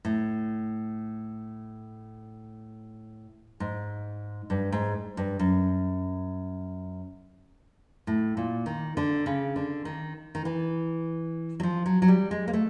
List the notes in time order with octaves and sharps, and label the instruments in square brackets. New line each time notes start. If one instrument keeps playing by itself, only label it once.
[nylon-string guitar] A2
G#2
G2
G#2
G2
F#2
A2
A#2
D#3
D3
C#3
D3
D#3
D#3
E3
F#3
F3
F#3
F#3
G3
G#3
A#3
A3